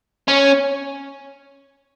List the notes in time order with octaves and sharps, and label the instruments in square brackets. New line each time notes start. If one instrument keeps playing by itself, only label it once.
[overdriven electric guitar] C#4